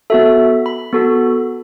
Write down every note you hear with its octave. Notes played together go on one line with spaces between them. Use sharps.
B3 F#4 A4 E5
B5
B3 F#4 A4